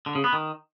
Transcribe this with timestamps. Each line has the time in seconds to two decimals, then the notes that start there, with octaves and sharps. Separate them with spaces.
0.06 D3
0.15 C#3
0.24 B3
0.33 D#3